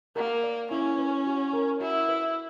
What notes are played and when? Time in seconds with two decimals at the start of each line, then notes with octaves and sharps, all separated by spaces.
0.16 A#3 A#4
0.43 D5
0.71 C#4 E4
0.99 B4
1.27 F#4
1.53 A#4
1.81 E4 F#4
2.09 B4